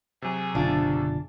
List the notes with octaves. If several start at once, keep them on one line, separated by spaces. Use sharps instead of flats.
C3 F#3 G#4
F#1 B2 D3 D4 F4